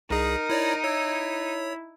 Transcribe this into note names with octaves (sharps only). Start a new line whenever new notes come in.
C2 D#4 G#4 A#4
E4 C#5 D5
E4 C#5